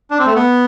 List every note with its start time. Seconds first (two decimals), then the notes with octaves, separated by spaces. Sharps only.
0.11 D4
0.19 C4
0.26 A3
0.35 B3